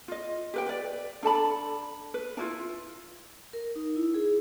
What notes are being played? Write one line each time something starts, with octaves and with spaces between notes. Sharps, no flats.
F4 D#5
G4 B4 G5
B4 D5
D4 A4 A5 B5
B4
D4 E4 F4
A#4
D#4
E4
G#4